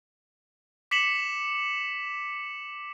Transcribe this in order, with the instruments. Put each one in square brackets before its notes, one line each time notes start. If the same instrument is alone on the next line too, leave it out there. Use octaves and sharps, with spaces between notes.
[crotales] D6 B6 C#7 E7 F#7